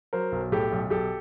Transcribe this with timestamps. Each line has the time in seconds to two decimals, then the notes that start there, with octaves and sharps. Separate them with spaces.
0.13 F#3 A#4 C5
0.32 B1
0.52 A2 G4 A4
0.72 B1
0.90 B1 G4 A4